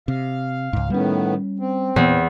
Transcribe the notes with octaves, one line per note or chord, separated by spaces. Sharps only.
C3 F5
C#2 G#2
A2 D#3 G3 B3 C#4
C4
E2 A#2 E3 B3